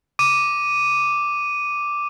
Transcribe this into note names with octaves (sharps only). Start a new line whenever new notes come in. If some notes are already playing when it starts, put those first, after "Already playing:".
D6 D#7